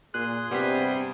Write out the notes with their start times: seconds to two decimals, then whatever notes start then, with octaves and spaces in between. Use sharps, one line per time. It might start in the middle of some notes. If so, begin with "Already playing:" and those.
0.14 A#2 G#4 C6 D#6 F#6
0.52 G2 C3 G3 B3 B6